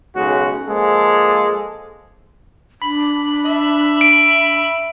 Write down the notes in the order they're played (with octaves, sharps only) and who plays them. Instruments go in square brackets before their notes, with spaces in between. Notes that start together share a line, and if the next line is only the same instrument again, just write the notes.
[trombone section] B1 C#3 G#3 F#4
F3 G#3 A#3 A4
[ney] D4 [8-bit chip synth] B5
[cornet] E5
[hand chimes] D7